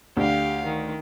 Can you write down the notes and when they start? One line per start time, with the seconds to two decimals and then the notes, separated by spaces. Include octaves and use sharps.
0.17 D2 G4 F5
0.65 D#3